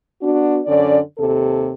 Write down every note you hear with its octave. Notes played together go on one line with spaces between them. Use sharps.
B3 D4 F#4
F#2 D3 C#4 D5
D#2 C3 A4